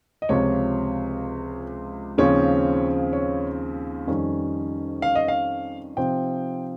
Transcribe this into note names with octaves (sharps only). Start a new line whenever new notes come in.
D#5
C#2 C3 F3 C#5
D#2 C#3 F3 C4 C#5
C#5
F2 D#3 G3 C#4
F5
D#5
F5
C3 F3 C4 D#4 G5